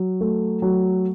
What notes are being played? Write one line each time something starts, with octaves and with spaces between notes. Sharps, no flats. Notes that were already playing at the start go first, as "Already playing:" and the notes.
Already playing: F#3
A3
F#3